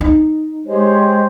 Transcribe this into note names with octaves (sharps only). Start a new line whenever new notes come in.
D#4
G#3 G4 C5 C#5